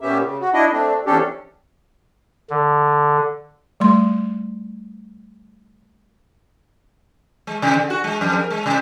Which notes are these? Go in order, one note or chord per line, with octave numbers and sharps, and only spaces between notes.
A#2 B3 C#4 G4 E5
C#3
F#4
D4 E4 D#5
A3 C4 D4
E2 C3 C#4 D4 G4 A4
D3
G3 A3 C6
G#3
C3
D3
F#4
G#3
F2
A#4
G#3
C3